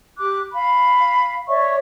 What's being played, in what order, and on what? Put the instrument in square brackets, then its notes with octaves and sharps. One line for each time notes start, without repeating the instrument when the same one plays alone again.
[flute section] G4 D6 F#6
F5 B5
C#5 D5 E5 C#6